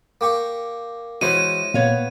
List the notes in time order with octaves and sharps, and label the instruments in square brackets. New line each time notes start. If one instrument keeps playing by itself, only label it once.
[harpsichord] A#3 G4 C#6
[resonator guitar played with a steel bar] E3 F#4 [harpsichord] G#3 C#4 C5 [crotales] D#7
[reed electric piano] A#2 [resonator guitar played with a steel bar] B3 C#5 F5